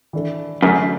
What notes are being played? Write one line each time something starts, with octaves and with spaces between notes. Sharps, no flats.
E3 D4 A4
F#2 D3 A3 D4 B4